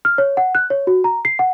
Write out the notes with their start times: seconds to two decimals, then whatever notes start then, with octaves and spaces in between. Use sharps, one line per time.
0.05 F6
0.18 C#5
0.37 F#5
0.55 F#6
0.70 C#5
0.87 F#4
1.04 A#5
1.25 C7
1.39 F#5